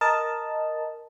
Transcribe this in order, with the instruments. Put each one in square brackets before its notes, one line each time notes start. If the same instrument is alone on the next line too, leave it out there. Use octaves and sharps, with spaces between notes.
[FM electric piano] A#4 D#5 A5